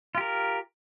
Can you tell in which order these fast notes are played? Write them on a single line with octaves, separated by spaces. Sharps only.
F4 G4 A#4